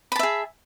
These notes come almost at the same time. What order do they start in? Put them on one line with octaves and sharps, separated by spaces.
B5 A5 E5 G#4